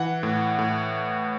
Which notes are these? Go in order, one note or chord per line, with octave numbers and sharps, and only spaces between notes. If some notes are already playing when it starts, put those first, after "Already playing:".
Already playing: E3 F#5
A2
A2